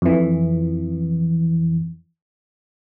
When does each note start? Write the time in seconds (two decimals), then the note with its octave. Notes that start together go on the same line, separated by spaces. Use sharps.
0.02 F2 E3